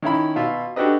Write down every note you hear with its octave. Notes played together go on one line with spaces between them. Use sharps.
D#3 C#4 E4 B5
B2 F4 E5
D4 F#4 G4 A4 B4 D#5